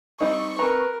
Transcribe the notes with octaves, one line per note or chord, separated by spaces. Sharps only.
G3 C4 D#4 C#6
C4 A#4 B4 A#5